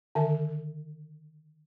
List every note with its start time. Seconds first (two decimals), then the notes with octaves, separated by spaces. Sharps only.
0.15 D3 D#3 E5